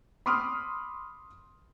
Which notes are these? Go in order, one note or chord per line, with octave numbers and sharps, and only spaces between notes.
B5 C6 D6 D#6 F6